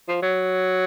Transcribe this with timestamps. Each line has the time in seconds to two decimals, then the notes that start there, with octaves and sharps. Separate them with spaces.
0.08 F3
0.22 F#3